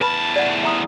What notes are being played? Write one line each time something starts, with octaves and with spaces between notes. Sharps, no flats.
E2 B4 A5 B5
D5 F#5
E5 A#5 D#6